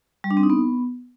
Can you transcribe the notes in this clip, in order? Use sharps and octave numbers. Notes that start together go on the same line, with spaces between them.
G3
D4
C4
D#4
B3